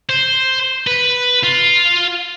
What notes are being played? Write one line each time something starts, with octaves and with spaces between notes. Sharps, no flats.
C5
B4
F4